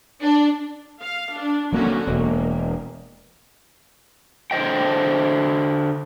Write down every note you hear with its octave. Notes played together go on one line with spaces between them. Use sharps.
D4
F5
D4
D3 F#3 A#3 C4 C#4 F#4
E1 A#3
D3 C5 D#5 G5